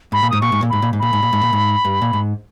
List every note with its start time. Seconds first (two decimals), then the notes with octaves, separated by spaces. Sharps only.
0.12 G#2 B5
0.23 A#2
0.30 G#2 D#6
0.41 A#2 C#6
0.52 G#2
0.62 A#2
0.69 G#2 B5
0.82 A#2
0.93 G#2
0.99 A#2 B5
1.13 G#2
1.23 A#2
1.33 G#2
1.43 A#2
1.53 G#2
1.85 G2
2.02 A#2
2.13 G#2